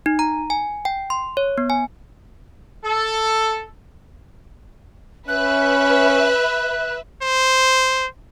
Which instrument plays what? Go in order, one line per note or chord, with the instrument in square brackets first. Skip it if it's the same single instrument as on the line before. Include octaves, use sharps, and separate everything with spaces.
[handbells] D#4
A#5
G#5
G5
C6
C#5
B3
G#5
[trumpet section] A4
[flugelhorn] C#4 [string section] B4 E5 [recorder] F#6
[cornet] C5